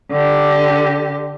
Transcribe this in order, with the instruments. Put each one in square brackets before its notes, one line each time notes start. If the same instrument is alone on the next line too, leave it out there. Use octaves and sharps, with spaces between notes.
[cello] D3 G4